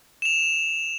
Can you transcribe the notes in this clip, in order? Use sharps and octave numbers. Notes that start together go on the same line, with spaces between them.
E7 F7